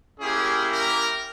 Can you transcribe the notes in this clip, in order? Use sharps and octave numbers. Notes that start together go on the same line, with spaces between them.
A#3 C#4 E4 G4 G#4
A#4